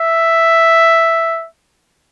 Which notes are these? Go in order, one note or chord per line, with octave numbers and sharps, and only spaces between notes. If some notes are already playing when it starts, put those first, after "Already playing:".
Already playing: E5